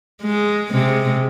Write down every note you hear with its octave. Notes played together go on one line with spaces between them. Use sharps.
G#3
C3 G#3